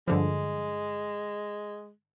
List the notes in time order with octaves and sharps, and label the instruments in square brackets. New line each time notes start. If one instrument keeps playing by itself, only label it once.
[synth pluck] G2 D3 F3 [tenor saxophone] G#3